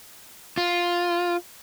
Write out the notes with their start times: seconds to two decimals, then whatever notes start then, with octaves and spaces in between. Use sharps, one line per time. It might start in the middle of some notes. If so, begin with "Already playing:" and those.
0.58 F4